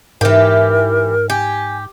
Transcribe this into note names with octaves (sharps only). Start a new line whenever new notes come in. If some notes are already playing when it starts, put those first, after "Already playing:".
G#2 E3 G4 A#4
G4 G#5